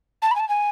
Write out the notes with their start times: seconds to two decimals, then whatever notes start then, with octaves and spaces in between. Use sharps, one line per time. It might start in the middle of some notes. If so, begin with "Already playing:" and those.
0.22 A5
0.31 B5
0.35 G#5
0.39 A5
0.48 G#5